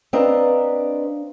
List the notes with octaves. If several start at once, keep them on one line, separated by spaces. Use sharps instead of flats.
C4 D4 B4 D#5 F5 A#5